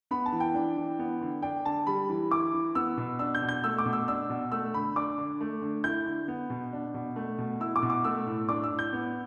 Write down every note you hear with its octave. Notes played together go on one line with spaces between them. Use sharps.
B3 B5
A5
E3
G5
D4
E3
B3
D3
D4 G5
D3 A5
G3 B5
E3
E4 D6
E3
B3 E6
B2
D4 E6
G6
B2
G6
A3 E6
D6
B2
E6
D4 E6
B2
A3 E6
D3 B5
D4 D6
D3
A3
D3
E4 G6
D3
B3
B2
D4
B2
A3
B2
E4 E6
D6
B2
D6
A3 E6
A2
D4 D6
E6
A2
G6
B3